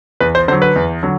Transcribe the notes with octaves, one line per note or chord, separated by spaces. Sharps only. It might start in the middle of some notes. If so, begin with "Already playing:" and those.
E2 B4
C5
D3 F#3 C5
B4
E2
D3 F#3